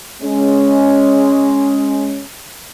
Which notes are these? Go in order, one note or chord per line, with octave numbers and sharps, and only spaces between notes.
G#3 C#4